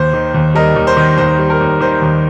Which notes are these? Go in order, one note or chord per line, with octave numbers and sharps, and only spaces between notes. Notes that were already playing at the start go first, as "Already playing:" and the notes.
Already playing: D#2 C5
D#3
D#2
G3 A#4 D#5
D#2
C5
D#3
D#2 C5
G3
A#4
D#2
D#3 C5
D#2